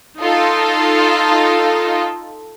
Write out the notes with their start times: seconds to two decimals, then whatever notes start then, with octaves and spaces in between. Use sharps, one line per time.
0.19 D#4 F4 A4